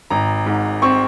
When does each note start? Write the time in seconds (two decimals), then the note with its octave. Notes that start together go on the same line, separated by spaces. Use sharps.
0.10 G#1 A#5
0.46 G#2
0.82 C4 C#6